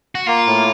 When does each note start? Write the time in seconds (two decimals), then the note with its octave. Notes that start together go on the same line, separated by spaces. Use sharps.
0.15 F#4
0.27 A#3 F4
0.47 A2